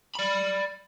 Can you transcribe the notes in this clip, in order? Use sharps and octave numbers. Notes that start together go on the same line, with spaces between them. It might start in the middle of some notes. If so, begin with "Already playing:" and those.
D5 B5